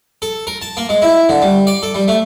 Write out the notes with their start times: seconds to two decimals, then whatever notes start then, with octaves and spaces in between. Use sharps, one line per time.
0.22 A4
0.47 A#4
0.62 A5
0.77 A#3
0.89 G#3
1.02 E4
1.29 D3
1.42 G3
1.67 D5
1.83 A4
1.95 G3
2.08 A3